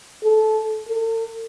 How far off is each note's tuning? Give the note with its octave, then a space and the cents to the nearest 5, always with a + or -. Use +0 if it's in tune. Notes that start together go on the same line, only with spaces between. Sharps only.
A4 -20
A4 +45